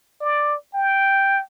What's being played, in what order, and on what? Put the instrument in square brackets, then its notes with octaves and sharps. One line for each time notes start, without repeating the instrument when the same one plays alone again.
[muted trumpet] D5
G5